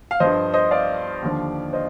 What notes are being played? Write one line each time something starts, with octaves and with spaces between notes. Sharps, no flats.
F5
G2 F3 C5 D#5
C5 D#5
D5 F5
D#2 D3 F3
C5 D#5